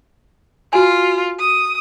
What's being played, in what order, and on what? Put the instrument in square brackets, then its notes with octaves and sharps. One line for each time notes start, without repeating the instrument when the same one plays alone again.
[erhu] F4 [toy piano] F#4 B4 G#5
[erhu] D#6